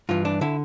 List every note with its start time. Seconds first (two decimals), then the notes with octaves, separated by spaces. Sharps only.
0.09 G2 E3 F4
0.25 D4
0.41 D3 E4